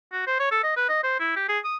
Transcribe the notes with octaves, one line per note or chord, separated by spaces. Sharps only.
F#4
C5
C#5
A4
D#5
B4
D#5
C5
E4
G4
G#4
D#6